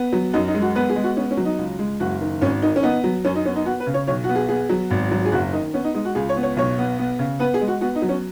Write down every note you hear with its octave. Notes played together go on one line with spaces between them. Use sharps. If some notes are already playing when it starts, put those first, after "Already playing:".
Already playing: B3
F#3
F#2 D#4
D#4
G#3
F#4
B3 B4
G#4
G#3
F#4
B3 C#4
C#4
F#3
D#4
C#2
G#3
F#1 F#4
D#3
G#1 C#4
D#3 D#4
C#4
B3 D#4
F#3
F#2 C#4
D#4
B3 C#4
D#4
B3 F#4
B4
C#3
C#5
B1 C#5
F#4
B3
G#4
B3 G#4
F#3
G#1
F#3
G#4
F#1 F#4
D#3 D#4
B3 C#4
D#4
G#3 D#4
F#4
C#2 G#4
C#5
B3
C#5
B1 C#5
B3
B3
C#3
B3 B4
G#4
G#3
F#4
B3 F#4
D#4
F#3
C#4